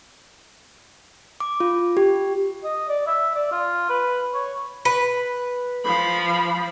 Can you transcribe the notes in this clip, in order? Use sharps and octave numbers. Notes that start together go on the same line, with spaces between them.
D6
F4
G4
D#5
D5
E5
D5
F4
B4
C#5
B4
F3 B5